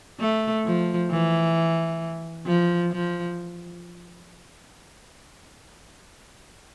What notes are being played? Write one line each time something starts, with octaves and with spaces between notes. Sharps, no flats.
A3
F3
E3
F3
F3